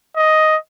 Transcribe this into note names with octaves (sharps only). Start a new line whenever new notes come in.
D#5